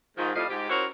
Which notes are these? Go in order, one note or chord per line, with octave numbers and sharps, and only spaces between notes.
G#2 D#3 F3
F2 A2 F3 G3 D#5 F5
G#2 G4
C#4 E4 F#4 A#4 C5 C#5